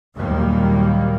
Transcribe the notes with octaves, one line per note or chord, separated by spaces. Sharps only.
D#2 A#2 D#3 F#3 G3 A#3